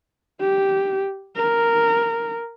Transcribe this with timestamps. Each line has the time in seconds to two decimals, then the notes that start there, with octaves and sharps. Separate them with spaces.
0.40 G4
1.36 A#4